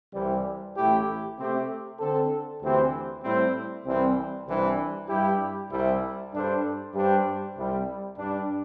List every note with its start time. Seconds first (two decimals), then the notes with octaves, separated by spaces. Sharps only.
0.13 C2 C3 E3 G3
0.76 A1 A2 A3 E4 G4
1.37 C3 A3 C4 G4
1.99 D3 C4 A4
2.61 D2 C3 E3 C4 G4
3.23 A2 G3 C4 E4 C5
3.85 C2 C3 E3 G3 C4
4.47 C2 C3 E3 G3 D4
5.09 G2 G3 E4 G4
5.71 C2 C3 G3 E4
6.32 G2 G3 D4 A4 C5
6.94 G2 G3 D4 G4 C5
7.56 C2 C3 G3
8.18 G2 G3 D4